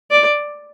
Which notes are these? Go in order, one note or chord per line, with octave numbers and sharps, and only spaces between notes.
D5